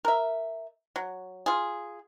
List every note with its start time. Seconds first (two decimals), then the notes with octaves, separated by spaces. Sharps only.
0.05 A#4 E5
0.96 F#3
1.46 F4 G#4